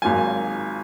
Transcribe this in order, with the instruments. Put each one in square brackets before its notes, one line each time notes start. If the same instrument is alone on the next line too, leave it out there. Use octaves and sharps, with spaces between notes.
[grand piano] G#1 G#2 F#3 A#3 F4 G#5